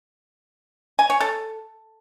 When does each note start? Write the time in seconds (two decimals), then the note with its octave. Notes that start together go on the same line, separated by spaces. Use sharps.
0.99 G#5
1.10 C#5
1.20 A4